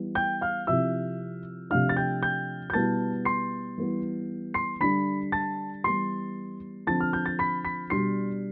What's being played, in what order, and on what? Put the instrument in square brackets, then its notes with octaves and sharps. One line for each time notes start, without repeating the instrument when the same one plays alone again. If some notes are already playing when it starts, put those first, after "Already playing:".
Already playing: [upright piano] E3 G3 B3 E4
[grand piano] G5 G6
F5 F6
[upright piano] C3 F3 C4 E4 [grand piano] E5 E6
[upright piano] C3 F3 A3 D4 [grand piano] F5 F6
[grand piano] A6
G5 G6
G5 G6
G6
[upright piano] B2 G3 B3 E4 [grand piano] A5 A6
[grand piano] C6 C7
[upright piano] E3 G3 B3
[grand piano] C6 C7
[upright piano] D3 G3 D4 [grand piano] B5 B6
[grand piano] A5 A6
[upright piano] E3 G3 B3 [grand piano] C6 C7
[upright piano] D3 F3 C4 [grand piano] A5 A6
[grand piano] F6
G6
A6
B5 B6
B5 B6
[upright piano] B2 G3 D4 [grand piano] C6 C7